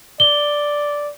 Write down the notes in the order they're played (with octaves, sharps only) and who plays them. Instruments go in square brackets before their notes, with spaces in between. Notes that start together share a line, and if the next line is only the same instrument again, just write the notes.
[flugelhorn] D5 [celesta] G7